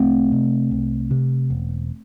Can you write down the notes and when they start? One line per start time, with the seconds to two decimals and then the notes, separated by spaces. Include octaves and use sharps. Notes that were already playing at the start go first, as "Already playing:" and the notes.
Already playing: C2 A3 C4
0.32 C3
0.71 C2
1.11 C3
1.50 E1